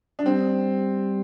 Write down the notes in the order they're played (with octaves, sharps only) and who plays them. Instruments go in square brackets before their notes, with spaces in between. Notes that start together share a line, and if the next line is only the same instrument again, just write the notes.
[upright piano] D4
[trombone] G3 [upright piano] C4